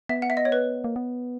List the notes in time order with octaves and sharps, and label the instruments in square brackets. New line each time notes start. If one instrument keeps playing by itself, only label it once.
[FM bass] B3 [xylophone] E5
[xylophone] F#5
E5
D#5
C#5
B4
[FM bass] A#3
B3